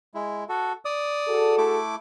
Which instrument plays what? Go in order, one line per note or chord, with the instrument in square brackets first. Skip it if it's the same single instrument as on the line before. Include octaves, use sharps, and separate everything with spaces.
[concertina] G#3 E4
F#4 A4
D5 D#6
[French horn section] F#4 G#4 A4
[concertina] A3 E4 D6